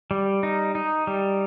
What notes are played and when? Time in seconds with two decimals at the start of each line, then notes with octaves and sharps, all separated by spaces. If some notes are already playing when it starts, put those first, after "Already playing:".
0.11 G3
0.43 D#4
0.75 D#4
1.07 G3